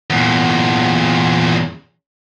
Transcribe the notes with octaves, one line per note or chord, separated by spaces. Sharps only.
E2 A#2